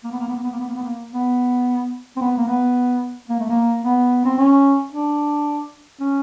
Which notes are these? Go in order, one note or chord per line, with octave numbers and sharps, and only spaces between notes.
A#3
B3
A#3
B3
A#3
B3
A#3
B3
A#3
B3
A#3
B3
C4
B3
A#3
B3
A#3
A3
A#3
B3
C4
C#4
D4
C#4